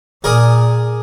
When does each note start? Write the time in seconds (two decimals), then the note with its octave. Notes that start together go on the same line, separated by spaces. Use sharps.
0.24 A#2 G#4 A#4 D5